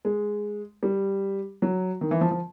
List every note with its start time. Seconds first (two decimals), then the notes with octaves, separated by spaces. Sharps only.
0.05 G#3
0.83 G3
1.62 F#3
2.01 D#3
2.11 E3
2.21 F3
2.31 F3